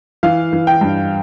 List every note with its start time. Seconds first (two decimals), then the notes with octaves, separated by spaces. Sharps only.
0.23 E3 F5
0.53 E3
0.67 G5
0.81 G2